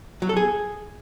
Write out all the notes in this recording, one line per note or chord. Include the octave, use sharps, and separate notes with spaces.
F#3
A4
G#4